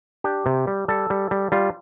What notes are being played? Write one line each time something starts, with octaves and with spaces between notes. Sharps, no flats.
D4 G4
C3
G3
G3 A4
G3
G3
G3 F4